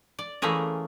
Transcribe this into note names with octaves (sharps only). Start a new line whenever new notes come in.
D5
E3 A3 A#3 C#4 G#4 A#4